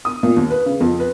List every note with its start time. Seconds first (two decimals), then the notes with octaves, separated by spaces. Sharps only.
0.05 D#6
0.23 A#2
0.37 D#2
0.51 B4
0.66 C#3
0.80 F2
1.00 B4